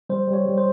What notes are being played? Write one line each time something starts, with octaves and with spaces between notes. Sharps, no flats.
G3 C5
G3
C#5
G3
C5